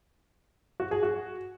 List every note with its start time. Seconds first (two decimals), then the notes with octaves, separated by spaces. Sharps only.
0.80 F#4
0.91 G#4
1.03 F#4